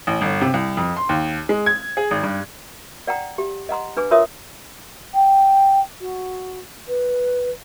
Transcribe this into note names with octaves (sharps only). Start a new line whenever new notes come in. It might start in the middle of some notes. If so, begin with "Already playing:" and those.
A1
G1
C3
C2
F2
C6
D#2
G#3
G#6
G#4
G#1
G2
D5 F#5 G5 A#5
G4
D#5 F#5 A#5 C6
D4 B4 G#5 D6
F4 A#4 C#5 E5 C6 D#6
G5
F#4
B4